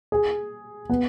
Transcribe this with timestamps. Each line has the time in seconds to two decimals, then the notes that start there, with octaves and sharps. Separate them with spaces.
0.12 G#4
0.90 B3